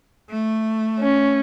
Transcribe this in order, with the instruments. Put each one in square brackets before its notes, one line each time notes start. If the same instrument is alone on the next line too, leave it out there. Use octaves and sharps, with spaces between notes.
[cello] A3
[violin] C#4